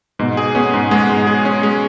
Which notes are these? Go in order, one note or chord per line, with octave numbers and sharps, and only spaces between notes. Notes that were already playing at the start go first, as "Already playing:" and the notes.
G#2 B2
G#4
B3 C#4
G#2
G#3 B3
G#2
G#4
C#4
G#3